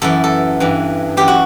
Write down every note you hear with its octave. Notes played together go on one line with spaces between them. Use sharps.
F#2 E3 A4
A4
G2 E3
F#2 E3 G4
F#4